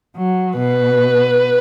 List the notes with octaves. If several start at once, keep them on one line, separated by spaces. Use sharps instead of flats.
F#3
B2 B4